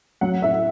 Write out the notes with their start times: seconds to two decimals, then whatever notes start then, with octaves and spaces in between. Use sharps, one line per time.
0.21 F#3 F#5
0.42 A2 E5